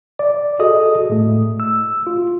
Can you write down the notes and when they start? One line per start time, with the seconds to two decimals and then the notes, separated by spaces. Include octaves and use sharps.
0.19 D5
0.59 F#4 G#4 A4 D#5 D#6
1.10 A2 A3
1.60 E6
2.07 F4